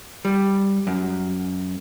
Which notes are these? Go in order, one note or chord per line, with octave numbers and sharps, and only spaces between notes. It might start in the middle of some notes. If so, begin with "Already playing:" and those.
G3
F#2